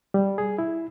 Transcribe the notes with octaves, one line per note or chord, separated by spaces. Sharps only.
G3
G#4
E4